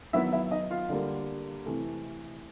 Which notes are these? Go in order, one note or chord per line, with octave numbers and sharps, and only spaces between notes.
D#3 F#3 B3 E4 E5
E4 E5
D#4 D#5
F4 F5
D3 G3 A#3
C3 E3 A3